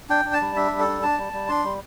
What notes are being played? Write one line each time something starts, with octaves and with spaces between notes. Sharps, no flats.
D4 G5
D4
A5
G3
D4 E5
G3
A4
D4
D4 A5
G3
G3
D4 C6
G3